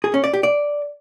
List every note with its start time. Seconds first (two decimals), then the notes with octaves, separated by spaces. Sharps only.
0.04 G#4
0.14 C#4
0.24 D5
0.33 G4
0.43 D5